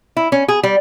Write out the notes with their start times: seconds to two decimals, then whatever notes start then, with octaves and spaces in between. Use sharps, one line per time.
0.17 E4
0.32 C#4
0.48 G#4
0.63 G3